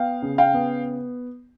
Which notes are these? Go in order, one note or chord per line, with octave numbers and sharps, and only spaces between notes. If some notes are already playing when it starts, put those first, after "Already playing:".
Already playing: B3 F5 G5
C#3
F5 G5
B3